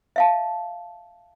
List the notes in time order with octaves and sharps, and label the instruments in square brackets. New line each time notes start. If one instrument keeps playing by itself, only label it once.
[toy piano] E5 F5 A5